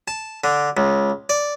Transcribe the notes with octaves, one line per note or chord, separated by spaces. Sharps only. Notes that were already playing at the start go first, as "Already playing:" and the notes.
A5
D3
C#2
D5